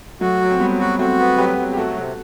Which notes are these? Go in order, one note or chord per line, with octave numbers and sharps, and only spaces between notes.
F#3 A3 F#4
F#3
C4
F#3 G3 B3
F#4
A3 C4 F#4
B3
F#3 G4 B4
F#3
G4
A3 F#4 A4
C3